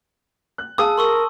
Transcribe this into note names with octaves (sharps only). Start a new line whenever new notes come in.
F#6
G#4 F5 A5 D#6 E6
A#4 C6 C#6 E6